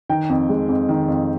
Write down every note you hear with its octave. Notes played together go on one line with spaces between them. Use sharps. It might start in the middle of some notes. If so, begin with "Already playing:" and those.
D#3 G5
F2
G#3
F2
D#3
F2